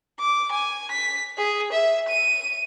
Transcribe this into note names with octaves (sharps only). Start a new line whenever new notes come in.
D6
G#5
B6
G#4
E5
D#7